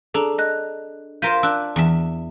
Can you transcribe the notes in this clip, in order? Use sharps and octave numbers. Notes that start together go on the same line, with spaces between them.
D4 G#4 A4 A#5
D#5 F#6
F4 A#4 C5 G6 B6 D#7
D4 E6 F#6
E2 E5